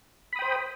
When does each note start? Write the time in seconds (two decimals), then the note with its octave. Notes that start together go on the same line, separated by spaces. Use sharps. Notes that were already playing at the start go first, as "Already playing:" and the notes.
0.33 B5
0.36 D#6
0.39 G5
0.42 C5